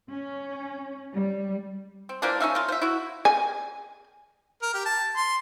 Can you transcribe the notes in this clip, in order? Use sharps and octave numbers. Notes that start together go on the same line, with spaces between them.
C#4
G3
C4
E3 F3 A#3 D4
C#4 D#4 E5 F5
A#3 F4
C5 E5
E4 F#4
G#5
A#4
G4
A5
C6